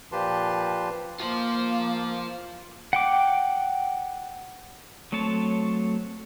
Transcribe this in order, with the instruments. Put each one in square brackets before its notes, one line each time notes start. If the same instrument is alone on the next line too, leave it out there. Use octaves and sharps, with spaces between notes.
[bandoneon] A#2 F3 G4 B4 A5 C6
[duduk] A#3 [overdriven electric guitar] F4 C5
[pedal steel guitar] F#5 G5 D6
F#3 A3 C4 C#5 A5